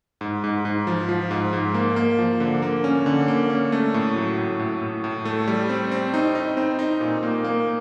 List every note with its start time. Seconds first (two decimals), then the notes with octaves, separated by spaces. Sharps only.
0.21 G#2
0.44 G#2
0.65 G#2
0.87 F3
1.09 F3
1.31 G#2
1.53 G#2
1.74 A#3
1.96 A#3
2.19 F3
2.40 D3
2.62 A#3
2.84 C#4
3.06 D3
3.28 A#3
3.50 C#4
3.72 A3
3.94 A2
4.15 F#3
4.38 A2
4.59 A2
4.82 A2
5.04 A2
5.25 A3
5.47 G3
5.69 C4
5.91 C4
6.14 D#4
6.35 D#4
6.57 C4
6.79 D#4
7.01 A#2
7.23 A#3
7.44 A#3